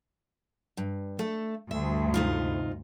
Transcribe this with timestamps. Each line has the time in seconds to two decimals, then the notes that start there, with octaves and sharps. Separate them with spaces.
0.77 G2
1.19 A3 A4
1.71 D2 G2 E5
2.14 C3 D#4 F4